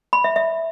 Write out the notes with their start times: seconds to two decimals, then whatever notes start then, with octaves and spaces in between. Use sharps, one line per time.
0.13 B5
0.24 E5
0.36 E5